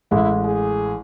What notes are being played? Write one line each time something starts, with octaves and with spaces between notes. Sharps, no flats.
A1 G#3 E4
G#4